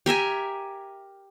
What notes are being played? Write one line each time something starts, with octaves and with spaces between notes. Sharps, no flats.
G4 A#4 E5 G#5